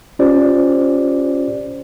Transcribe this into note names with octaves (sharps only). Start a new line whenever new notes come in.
C#4 F4 G4 C5 D5